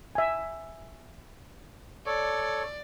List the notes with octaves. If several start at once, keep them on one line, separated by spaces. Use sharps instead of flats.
E5 G#5
A4 C#5 D5